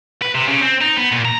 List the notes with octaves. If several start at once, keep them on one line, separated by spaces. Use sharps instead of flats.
B4
C3
C#3
C4
D#4
B3
A#2
A#5